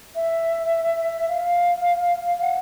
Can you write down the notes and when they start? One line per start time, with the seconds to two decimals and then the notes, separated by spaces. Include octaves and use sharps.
0.15 E5
1.29 F5
2.42 F#5